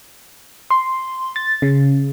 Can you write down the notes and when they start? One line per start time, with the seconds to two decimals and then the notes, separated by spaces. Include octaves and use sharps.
0.70 C6
1.36 A6
1.62 C#3